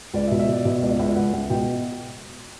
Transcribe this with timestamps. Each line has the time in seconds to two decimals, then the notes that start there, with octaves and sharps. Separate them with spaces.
0.14 C#2 D5
0.27 E5
0.31 B2
0.39 E5
0.49 B2 D5
0.65 B2 E5
0.82 C#2 D5
0.99 C#2 E5
1.16 C#2 F#5
1.33 C#2
1.50 B2 G5